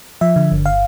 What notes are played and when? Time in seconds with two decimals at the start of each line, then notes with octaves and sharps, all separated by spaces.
0.21 F3 E5
0.36 D3
0.52 G1
0.66 F5